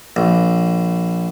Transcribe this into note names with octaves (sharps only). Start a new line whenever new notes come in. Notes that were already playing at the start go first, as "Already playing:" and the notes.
A#1